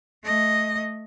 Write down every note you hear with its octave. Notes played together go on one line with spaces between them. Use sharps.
A3 D#5